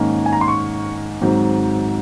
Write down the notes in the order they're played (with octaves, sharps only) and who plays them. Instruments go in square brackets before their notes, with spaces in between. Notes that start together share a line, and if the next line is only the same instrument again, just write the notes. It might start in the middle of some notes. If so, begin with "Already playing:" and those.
Already playing: [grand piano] G#2 D#3 A#3 C#4
G#5
A#5
C6
C#6
G#2 D#3 F#3 C4